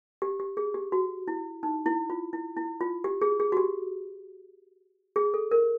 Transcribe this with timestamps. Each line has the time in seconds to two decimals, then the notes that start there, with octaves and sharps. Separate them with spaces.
0.22 G4
0.40 G4
0.57 G#4
0.74 G4
0.92 F#4
1.28 E4
1.63 D#4
1.86 E4
2.10 F4
2.33 E4
2.57 E4
2.81 F4
3.04 G4
3.22 G#4
3.40 G#4
3.52 F#4
3.57 G4
5.16 G#4
5.34 A4
5.51 A#4